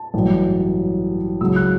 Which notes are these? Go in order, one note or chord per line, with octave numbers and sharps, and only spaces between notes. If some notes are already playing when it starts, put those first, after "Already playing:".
Already playing: A5
A1 G2 F#3
C#2 C#3 F#3 E6
F#6